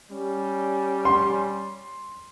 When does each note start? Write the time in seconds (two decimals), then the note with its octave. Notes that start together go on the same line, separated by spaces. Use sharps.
0.11 G3 C#4
1.05 C6